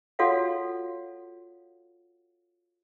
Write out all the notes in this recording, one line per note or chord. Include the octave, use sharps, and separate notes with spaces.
F4 F#4 A4 C#5 F5 F#5